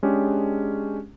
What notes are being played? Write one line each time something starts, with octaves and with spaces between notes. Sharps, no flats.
G#3 C#4 D4 G4 G#4